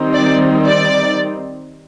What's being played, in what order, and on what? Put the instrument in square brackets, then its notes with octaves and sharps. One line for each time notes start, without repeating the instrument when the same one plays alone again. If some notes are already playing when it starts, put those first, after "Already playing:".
Already playing: [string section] D#3 G3 C4 D#4
D5
D5